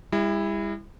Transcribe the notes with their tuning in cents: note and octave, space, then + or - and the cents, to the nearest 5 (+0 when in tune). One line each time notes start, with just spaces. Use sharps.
G3 +45 E4 +0